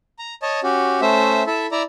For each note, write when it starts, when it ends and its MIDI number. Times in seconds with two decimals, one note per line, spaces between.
0.19 0.34 82
0.42 0.60 73
0.42 0.60 75
0.42 0.60 81
0.63 1.01 61
0.63 1.01 66
0.63 1.01 67
1.01 1.43 57
1.01 1.43 61
1.01 1.43 72
1.01 1.43 76
1.47 1.67 64
1.47 1.67 69
1.47 1.67 76
1.72 1.83 64
1.72 1.83 74
1.72 1.83 82